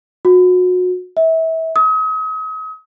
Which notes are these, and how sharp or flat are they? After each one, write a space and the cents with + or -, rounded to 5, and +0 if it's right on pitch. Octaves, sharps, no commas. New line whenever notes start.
F#4 -30
E5 -30
D#6 +40